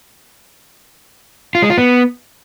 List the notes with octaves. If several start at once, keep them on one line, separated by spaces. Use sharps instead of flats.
F4
G#3
F4
B3